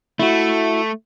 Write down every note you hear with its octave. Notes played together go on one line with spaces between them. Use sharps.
A3 E4 F#4